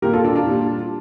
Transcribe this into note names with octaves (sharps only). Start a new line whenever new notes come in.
A#2 G3 G4 A#4
F4 A4
D4 F4
D4 F4
A#2 G3